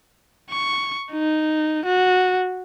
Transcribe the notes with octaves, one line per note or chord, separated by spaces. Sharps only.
C#6
D#4
F#4